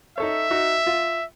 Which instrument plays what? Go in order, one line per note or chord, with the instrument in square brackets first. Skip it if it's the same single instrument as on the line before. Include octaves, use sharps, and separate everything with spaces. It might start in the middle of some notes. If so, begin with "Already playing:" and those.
[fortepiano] D#4 A4 C#5 [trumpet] E5
[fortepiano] D#4 F#4
F4